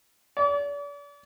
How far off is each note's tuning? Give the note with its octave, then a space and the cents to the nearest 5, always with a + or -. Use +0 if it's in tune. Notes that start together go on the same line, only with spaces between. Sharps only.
D5 -40